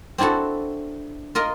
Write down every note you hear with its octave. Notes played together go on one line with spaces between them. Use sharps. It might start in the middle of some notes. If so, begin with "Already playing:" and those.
C4 D4 E4 F#4 A4
F4 A#4 D#5